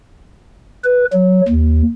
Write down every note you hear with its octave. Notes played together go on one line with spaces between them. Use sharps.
B4
F#3
D#2